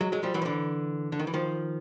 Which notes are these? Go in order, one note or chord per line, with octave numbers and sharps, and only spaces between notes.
F#3 G#3
F#3 G#3
F3 G3
E3 F#3
F3
D3 E3
D3
D#3
E3
D#3 F3